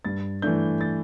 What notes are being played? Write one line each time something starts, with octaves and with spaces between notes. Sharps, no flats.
G2 A6
E3 A3 D4 G6
A6